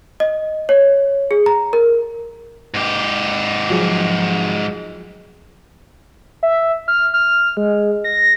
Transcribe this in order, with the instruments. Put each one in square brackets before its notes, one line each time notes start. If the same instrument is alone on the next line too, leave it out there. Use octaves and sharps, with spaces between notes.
[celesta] D#5
C#5
G#4
A#5
A#4
[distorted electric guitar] G#2 G4
[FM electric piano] F3 F#3 G#4
[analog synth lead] E5
F6
F6
G#3
A#6